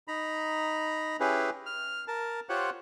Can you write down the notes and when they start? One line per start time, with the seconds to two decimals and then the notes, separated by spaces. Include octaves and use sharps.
0.08 D#4 A#5 B5
1.20 C#4 E4 G4 G#4 B4
1.66 F6
2.08 A#4 A5
2.49 F4 G4 C5 C#5 F#5